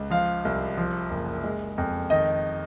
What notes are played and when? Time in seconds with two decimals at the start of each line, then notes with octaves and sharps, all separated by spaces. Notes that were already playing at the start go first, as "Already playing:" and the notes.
Already playing: C#2
0.10 F3 F5
0.45 C2
0.77 F3
1.10 F#1
1.44 G#3
1.78 F2
2.10 D#3 D#5